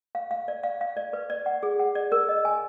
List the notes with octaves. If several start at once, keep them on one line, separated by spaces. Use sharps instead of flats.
F5
F5
D5
F5
F5
D5
B4
D5
F#5
G#4
F#5
D5
A#4
D#5
G#5